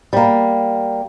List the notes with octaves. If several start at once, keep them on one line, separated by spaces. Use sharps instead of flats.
G3 A#3